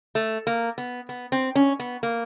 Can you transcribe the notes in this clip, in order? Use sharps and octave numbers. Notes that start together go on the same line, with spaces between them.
A3
A#3
B3
B3
C4
C#4
B3
A#3